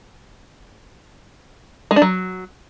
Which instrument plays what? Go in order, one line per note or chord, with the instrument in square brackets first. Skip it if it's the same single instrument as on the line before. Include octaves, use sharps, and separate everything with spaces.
[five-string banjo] G#3
D4
F#3